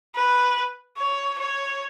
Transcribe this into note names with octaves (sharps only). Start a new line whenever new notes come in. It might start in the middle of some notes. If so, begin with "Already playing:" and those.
B4
C#5
C#5